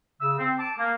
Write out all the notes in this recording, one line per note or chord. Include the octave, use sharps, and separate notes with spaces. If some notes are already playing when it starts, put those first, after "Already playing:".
C#3 E6
C4
A5 D6
A#3